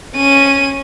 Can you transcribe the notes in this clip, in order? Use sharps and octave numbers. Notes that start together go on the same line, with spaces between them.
C#4 D#7